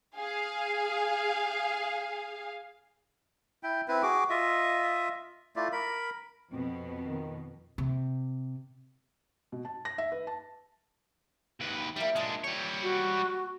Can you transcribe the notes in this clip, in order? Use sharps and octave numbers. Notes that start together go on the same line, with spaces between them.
G#4 F5
E4 G5
C4 E4 B4
F#4 G#4 D6
F4 D#5 E5
A3 E4 F4 D5
A#4 B5
F2 B2 C4
D#3
C3
B2
A5
A#6
E5
B4
A5
D#2 B4
G3 A#3 E4
A#2 G#3 D4 D5 A5
G3 C#5 G5
F#4